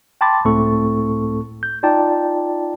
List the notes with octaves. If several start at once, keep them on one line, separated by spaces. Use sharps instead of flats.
G5 A5 B5 C6 D6 A6
C#2 A2 A3 C4 A4 C#6
G6
D#4 F4 D5 G5 A5